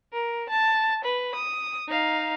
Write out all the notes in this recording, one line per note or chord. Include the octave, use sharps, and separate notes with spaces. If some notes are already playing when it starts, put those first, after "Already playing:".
A#4
A5
B4
D#6
D#4 F5